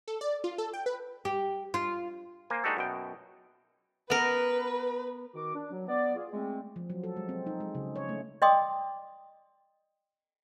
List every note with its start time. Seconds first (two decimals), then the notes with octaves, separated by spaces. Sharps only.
0.08 A4
0.21 D5
0.44 F4
0.58 A4
0.73 G5
0.86 B4
1.25 G4
1.74 F4
2.50 A#3 C5 G#5
2.64 G#3 D4 D#4 F#4 G4 A4
2.77 F#2 B2 G5
4.10 B3 A#4 B4
5.34 D#3 F#4 D6
5.55 D4
5.71 F#3
5.88 B3 D5
6.16 F4 G#4
6.32 G#3 A3 C4
6.76 F3
6.90 F#3
7.04 A4
7.17 G#3
7.29 C4
7.47 D#4
7.60 G#3
7.75 C#3
7.96 C#5
8.09 A3
8.42 D5 D#5 G5 C6 D6 D#6